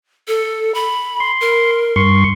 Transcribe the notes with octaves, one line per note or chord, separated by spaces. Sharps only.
A4
B5
C6
A#4
G2 C6 C#6